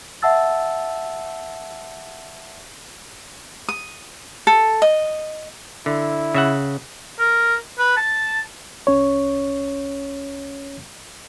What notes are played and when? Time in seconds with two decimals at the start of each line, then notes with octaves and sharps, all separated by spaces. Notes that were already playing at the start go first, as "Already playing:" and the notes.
0.22 E5 F#5 A5 E6 A6
3.69 D#6
4.47 A4
4.82 D#5
5.86 D3 E4
6.34 C#3 E5 F#5
7.19 A#4
7.78 B4
7.97 A5
8.87 C2 C#4 C#5